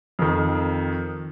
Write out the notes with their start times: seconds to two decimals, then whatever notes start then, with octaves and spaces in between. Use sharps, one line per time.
0.19 F2 D#3